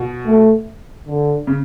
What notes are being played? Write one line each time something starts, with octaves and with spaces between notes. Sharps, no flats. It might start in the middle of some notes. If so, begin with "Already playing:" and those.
Already playing: B2
A3
D3
C#3